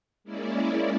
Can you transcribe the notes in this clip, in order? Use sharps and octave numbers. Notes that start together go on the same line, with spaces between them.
G#3 A#3 C#4 E4 D5